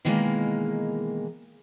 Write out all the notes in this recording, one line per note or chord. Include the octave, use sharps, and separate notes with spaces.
B2 D#3 E3 G3 G#3 A#3